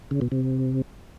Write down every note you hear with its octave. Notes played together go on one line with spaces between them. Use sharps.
C#3
B2
C3